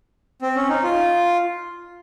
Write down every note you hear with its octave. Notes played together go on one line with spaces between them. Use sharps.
C4
C#4
D#4
F4